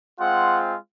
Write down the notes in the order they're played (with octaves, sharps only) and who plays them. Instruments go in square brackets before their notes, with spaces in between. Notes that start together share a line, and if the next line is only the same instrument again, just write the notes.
[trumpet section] G#3 C4 F4 F#5